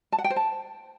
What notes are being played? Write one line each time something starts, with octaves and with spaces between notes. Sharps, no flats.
A5
F#5
G5
C5
A5